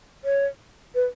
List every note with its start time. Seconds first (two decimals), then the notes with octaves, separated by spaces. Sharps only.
0.25 C#5
0.95 B4